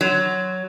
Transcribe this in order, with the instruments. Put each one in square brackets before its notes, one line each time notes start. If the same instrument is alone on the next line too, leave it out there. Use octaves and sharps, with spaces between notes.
[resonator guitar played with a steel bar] F#3